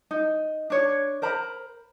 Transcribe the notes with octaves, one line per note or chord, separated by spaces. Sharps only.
D#4
D4 C#5
A#4 C5 A#5 B5